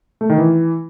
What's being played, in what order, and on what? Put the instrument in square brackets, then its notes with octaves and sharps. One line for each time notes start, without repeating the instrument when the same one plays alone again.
[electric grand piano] A3
D#3
E3